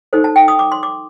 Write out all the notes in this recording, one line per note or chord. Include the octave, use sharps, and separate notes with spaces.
D#4 A4 C5
A5
G5
D#6
D6
C6
D6